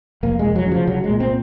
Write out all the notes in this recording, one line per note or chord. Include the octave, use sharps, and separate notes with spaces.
F1 A#3
G#3
F1
F#3
C#3
F3
C2 F#3
G#3
A#2
C4